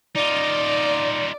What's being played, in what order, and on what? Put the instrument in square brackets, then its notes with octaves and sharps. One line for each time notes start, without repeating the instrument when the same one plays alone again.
[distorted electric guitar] D#4 F4 [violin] D5